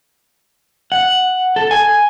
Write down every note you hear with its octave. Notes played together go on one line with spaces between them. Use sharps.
F#5
A4
G#5